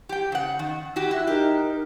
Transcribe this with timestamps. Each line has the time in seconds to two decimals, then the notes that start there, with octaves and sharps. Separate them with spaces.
0.09 G4 G5
0.32 C#3 F#5
0.59 D#3
0.96 E4 F#4 G4
1.11 E4 E5 F#6
1.27 D#4 G4 A#4